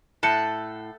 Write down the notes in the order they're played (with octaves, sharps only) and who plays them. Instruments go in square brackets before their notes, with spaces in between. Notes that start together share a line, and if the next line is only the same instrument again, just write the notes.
[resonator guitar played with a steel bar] A2 [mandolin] A4 F#5 [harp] A5 G6 C#7